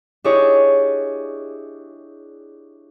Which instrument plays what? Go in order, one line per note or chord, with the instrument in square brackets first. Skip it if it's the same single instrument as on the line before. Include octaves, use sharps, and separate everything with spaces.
[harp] D4 E4 G4 G#4 C#5 D#5